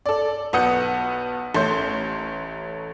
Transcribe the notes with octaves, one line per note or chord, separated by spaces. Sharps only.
A4 D5
B1 B3 F#5 D#6 G6 C#7
A1 A3 C#4 C6 G6